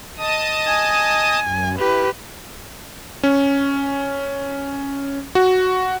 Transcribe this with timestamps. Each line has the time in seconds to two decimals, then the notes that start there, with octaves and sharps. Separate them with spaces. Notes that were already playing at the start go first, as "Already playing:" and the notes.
0.17 D#5 A5 D#6
0.67 G#5
1.42 F#2
1.79 E4 G4 B4
3.23 C#4
5.35 F#4